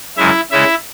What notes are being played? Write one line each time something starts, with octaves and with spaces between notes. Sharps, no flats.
F#2 C#3 G#3 E4 E5
C#3 G#3 C#4 E4 E5